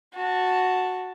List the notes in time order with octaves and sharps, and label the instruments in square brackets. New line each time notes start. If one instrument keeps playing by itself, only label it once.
[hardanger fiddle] F#4 A5